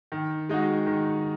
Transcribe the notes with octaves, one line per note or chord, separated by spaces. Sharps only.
D#3
G#3 D#4 F#4
D#3